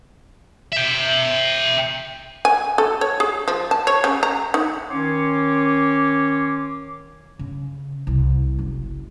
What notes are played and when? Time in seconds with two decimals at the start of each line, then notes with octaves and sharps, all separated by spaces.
0.72 E5 G5
2.45 G#5
2.78 A4
3.01 C#5
3.20 G#4
3.48 F3
3.71 A5
3.87 C#5
4.04 C#3
4.23 A#5
4.54 D#4
4.89 D#3 C#4 C#5 C6 D6
7.39 C#3
8.07 C2
8.59 F#1